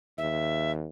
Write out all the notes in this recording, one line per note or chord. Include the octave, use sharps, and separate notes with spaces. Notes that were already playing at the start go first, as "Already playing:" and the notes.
D#2 E5